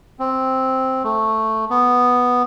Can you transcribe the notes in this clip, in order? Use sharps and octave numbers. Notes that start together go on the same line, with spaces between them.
C4
A3
B3